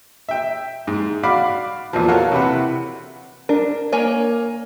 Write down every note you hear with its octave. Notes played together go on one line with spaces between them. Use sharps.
E5 G5
G#2
F#4 D5 F5 B5 D6
E2 A#2 E3 F3
F#4 A4 A#4 C#5 F5 F#5
C3 E3 B4 F#5
D4 A#4
A#3 C#5 G#5